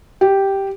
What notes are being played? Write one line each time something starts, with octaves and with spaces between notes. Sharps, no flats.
G4